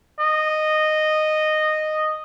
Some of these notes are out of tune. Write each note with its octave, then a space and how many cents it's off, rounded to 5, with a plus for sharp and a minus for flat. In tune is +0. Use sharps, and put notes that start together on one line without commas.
D#5 -10